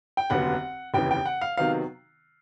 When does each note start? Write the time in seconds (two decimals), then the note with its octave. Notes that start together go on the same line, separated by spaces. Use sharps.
0.17 G5
0.30 F1 D#2 D3 F#3 B3 F#5
0.94 F1 D#2 C#3 E3 G5
1.11 G5
1.26 F#5
1.41 F5
1.57 C3 D#3 F#3 B3 F5